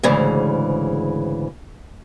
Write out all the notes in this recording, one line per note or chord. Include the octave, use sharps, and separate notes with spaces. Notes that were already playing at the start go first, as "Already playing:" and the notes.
D2 G#2 C#3 E3